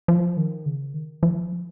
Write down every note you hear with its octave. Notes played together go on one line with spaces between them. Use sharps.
F3
D#3
C#3
D#3
F3